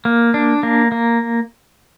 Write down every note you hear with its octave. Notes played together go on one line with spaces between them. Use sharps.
A#3
D4
A#3
A#3